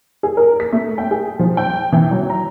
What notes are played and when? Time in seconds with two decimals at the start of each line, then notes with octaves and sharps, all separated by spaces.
0.23 G#4
0.37 A#4
0.60 B6
0.72 A3
0.98 G5
1.11 G#4
1.39 F3
1.57 G5
1.92 E3
2.11 F#3
2.30 A#5